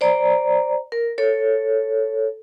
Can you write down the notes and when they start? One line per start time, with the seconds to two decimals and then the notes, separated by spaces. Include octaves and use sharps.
0.01 C5 D5 A#5
0.92 A#4
1.18 A4 C#5